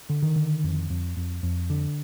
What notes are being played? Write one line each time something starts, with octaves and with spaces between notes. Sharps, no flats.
D3
D#3
D3
F2
F2
F2
F2
D3